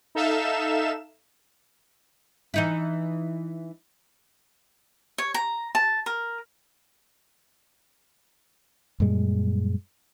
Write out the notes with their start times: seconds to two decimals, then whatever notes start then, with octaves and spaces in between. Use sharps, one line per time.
0.15 D#4 A4 E5 F5 E7
2.54 E3 D#4 E4
5.18 C#5
5.34 A#5
5.75 A5
6.06 A#4
9.00 F#2 A#2 G3 G#3